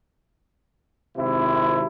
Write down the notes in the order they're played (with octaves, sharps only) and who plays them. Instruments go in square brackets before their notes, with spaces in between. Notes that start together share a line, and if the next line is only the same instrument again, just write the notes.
[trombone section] G#1 C3 E4